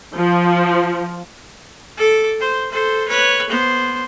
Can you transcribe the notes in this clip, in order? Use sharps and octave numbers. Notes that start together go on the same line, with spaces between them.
F3
A4 D6
C5
A4 C5
B4 C#5
B3 C5